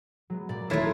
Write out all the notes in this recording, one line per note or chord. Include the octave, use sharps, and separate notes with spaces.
F#3 G#3 B3
A#2 A#3 D5
E1 D#3 A3 E4 A4 A#4 C#5 C6